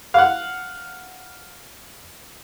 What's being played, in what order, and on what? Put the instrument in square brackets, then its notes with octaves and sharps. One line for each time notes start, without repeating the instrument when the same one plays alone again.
[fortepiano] F5 F#5